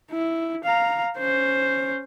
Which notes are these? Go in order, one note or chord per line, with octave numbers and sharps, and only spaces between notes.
E4
F5 A#5
C#4 C5